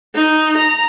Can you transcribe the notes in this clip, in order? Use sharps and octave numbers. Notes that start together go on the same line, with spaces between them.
D#4
A#5